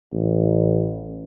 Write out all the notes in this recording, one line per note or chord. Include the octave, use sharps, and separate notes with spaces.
A1